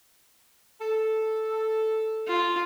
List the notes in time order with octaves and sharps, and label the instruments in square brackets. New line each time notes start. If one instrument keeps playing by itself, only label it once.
[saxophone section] A4
[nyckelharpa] F4